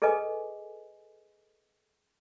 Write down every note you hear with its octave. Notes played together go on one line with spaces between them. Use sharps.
G#4 A4 B4 D#5 G#5